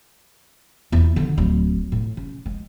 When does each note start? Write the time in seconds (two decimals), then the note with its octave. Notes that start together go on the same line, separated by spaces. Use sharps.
0.92 E2 E4
1.16 D3 D#3
1.37 D1 F#3
1.92 A2
2.17 C#3
2.46 G#3